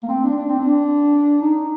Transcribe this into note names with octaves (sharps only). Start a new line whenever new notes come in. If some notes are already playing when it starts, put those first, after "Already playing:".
A#3
C4
D4
D4
C4
D4
D#4